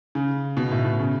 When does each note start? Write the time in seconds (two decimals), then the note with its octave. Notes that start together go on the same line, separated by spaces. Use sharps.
0.15 C#3
0.57 B2
0.71 A2
0.85 B2
0.99 C#3